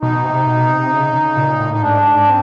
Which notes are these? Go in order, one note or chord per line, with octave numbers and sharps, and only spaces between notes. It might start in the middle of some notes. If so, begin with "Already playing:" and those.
B2 D#4
C3
B2
C3
C#3
C#3
A#2
A2
D#4
G#2 D4
C4